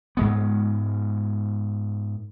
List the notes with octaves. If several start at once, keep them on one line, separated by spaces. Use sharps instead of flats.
G#2 G#3 B3